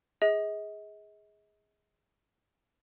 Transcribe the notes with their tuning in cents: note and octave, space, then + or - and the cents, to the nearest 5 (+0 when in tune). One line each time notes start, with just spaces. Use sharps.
G#4 -5 D#5 +40